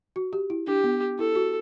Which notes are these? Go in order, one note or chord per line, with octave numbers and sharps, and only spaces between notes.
F#4
G4
E4
D4 G4
B3
E4 A4
F#4